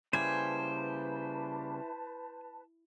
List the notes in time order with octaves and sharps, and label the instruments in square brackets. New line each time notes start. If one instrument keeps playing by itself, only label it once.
[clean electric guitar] C#3 G3 A#3 [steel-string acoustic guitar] E4 [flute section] B4 A5 [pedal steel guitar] C5 G#5